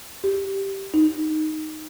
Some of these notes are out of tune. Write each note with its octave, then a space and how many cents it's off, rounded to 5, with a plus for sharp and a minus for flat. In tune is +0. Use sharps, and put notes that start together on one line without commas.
G4 -5
D#4 +0